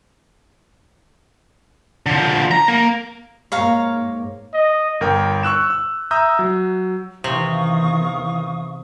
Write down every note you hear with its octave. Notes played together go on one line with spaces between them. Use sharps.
D3 F3
A#5
A#3
G#2 A#3 C#5 F5 A#5
D#5
G1 A#4 G5
C#6 E6 F#6 E7
E6
E5 A#5 D#6 E6 G6
F#3
E2 C3 D#3 E3 F5 C#6 D#6